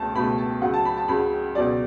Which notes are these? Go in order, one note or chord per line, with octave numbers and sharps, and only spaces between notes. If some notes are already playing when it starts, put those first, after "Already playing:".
Already playing: C#2 B2 A3 A5
C#2 B2 A3 B5
A5
C#2 C#3 F#3 F#5
A5
B5
A5
C#2 C#3 F#3 B5
C#2 B2 F#3 D5